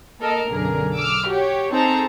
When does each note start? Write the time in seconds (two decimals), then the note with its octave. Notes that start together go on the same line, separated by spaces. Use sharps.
0.20 A#3 A4 A#4 D#5
0.50 B1 F#2 D3 G#4 A#4
0.96 D6 E6 F6
1.28 F#4 G4 C#5
1.71 C4 D#4 G#4 A4 A5 A#5